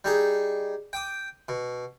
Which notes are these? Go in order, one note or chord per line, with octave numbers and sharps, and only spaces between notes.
G3 D#4 G#4
G5 D6 D#6
B2